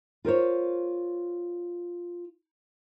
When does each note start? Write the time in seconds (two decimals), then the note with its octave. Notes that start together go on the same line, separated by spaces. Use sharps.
0.25 F4 A#4 C5 C#5